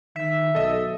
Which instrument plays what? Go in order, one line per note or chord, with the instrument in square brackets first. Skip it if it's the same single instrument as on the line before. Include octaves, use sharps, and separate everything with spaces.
[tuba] D#3 [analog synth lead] E5
[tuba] B1 [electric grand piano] A4 D#5